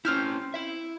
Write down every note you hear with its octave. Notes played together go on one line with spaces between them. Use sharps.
C4 C#4 E4 F6 G6
E4 E5